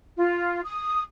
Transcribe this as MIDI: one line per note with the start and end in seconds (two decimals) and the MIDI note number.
0.18 0.61 65
0.65 1.01 87